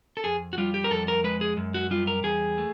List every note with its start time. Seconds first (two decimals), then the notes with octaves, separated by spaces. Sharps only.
0.17 A4
0.24 F2 G#4
0.53 F#4
0.58 G3 F4
0.74 G4
0.84 A#4
0.91 F2 A4
1.08 A#4
1.24 G#3 B4
1.41 G#4
1.57 F#2
1.74 F#4
1.91 G3 F4
2.07 A#4
2.23 E2 G#4
2.58 A3